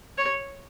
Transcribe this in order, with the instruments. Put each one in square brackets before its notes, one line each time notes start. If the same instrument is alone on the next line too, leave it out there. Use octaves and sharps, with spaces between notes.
[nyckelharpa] C#5